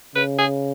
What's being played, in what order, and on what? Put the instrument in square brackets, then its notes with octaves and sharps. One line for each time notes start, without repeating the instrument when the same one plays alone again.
[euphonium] C#3 [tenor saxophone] B4
[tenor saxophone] G#4